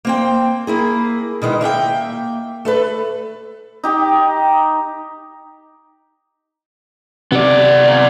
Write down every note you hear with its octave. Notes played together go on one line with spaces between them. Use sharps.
A#3 C4 G5
A#3 E4 G#4
B2 D#3 G#3 E4
A#3 E5 F#5 G5
A3 A4 B4
D#4 G4 G5
C3 B3 D5